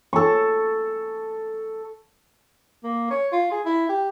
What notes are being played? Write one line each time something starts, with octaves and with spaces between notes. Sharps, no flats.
A4 C#6
A#3
C#5
F4
G#4
E4
G4